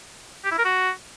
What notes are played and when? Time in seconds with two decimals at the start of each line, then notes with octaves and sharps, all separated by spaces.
0.45 G4
0.52 E4
0.58 A#4
0.65 F#4